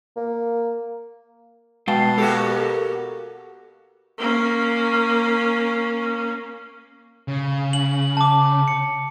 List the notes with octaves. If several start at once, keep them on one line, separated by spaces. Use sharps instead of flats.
A#3
B2 G#3 F5 G5 A5 A6 C7
A#3 F#4 G4 A4
A#4
A#3 C#4
C#3
F#7
A5 D6
C#7